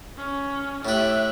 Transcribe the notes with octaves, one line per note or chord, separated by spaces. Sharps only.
C#4
A2 G4 E5 F#6